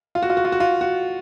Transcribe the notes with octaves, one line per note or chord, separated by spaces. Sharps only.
F4
F#4
F4
F#4
F4
F#4
F4
F#4